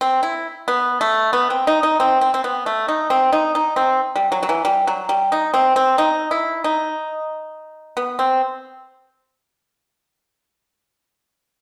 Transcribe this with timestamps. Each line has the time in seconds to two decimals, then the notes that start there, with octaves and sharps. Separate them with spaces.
0.01 C4
0.23 E4
0.68 B3
1.01 A3
1.33 B3
1.50 C4
1.67 D#4
1.83 D#4
2.00 C4
2.21 C4
2.34 C4
2.44 B3
2.66 A3
2.88 D#4
3.10 C4
3.33 D#4
3.55 D#4
3.76 C4
4.16 G3
4.32 F#3
4.43 F#3
4.49 E3
4.65 G3
4.87 F#3
5.09 G3
5.32 D#4
5.54 C4
5.76 C4
5.98 D#4
6.31 E4
6.64 D#4
7.97 B3
8.19 C4